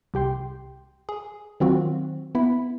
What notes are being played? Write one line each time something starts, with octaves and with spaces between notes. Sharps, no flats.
C2 G4 G5 C6
G#4
D#3 F#3 C4 F4 F#4
B3 E4 B5